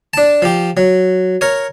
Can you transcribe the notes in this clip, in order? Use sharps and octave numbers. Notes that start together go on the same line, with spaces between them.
D4 A5
F3 G4
F#3
A#4 C#5